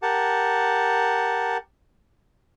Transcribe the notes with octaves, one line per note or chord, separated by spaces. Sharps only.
G4 A#4 F#5 A5